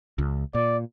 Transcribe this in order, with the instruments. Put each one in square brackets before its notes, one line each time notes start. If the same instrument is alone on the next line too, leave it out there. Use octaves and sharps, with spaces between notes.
[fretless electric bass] C#2
[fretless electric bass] A#2 [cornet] D5